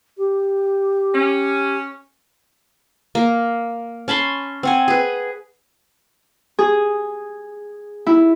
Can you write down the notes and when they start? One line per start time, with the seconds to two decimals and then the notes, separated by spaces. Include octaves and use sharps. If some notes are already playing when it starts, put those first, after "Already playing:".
0.17 G4
1.14 C#4
3.15 A#3
4.08 C#4 A5 B5 C6
4.63 C4 F#5 G#5
4.88 G#4 B4
6.59 G#4
8.07 E4